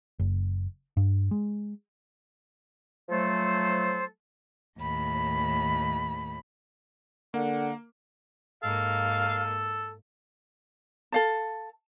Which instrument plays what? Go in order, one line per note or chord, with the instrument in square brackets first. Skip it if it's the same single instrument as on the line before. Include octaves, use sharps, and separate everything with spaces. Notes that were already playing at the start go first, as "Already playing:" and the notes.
[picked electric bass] F#1
G2
G#3
[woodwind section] F3 F#3 A3 A4 C5
[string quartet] D#2 A2 B5
[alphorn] D3 [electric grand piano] A#3 [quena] F#5
[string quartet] G#2 A#3 [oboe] A4 [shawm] F5
[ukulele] A4 F5 A5